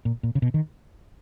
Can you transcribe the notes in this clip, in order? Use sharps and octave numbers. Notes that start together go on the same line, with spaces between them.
A#2
A#2
C#3
B2
D#3